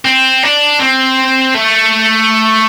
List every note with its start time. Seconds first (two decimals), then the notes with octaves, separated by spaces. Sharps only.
0.05 C4
0.43 D4
0.79 C4
1.54 A3